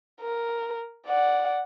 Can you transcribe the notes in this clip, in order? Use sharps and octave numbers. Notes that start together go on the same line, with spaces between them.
A#4
D5 F#5